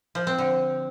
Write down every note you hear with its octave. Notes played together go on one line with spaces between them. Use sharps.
F3
C4
D3